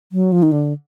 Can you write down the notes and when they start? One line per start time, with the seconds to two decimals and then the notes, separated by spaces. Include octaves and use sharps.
0.12 F#3
0.32 F3
0.43 D#3
0.52 D3